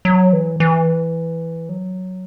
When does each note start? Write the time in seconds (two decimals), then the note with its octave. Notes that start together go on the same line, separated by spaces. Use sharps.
0.05 F#3
0.33 E3
0.60 E3
1.69 F#3